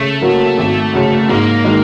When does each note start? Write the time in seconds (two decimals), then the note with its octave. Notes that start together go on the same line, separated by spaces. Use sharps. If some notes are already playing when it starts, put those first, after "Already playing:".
Already playing: C#3 A3
0.21 F#3 A#3
0.58 G#1
0.93 F#2 C#3
1.29 G#2 A#3
1.64 D#3 G#3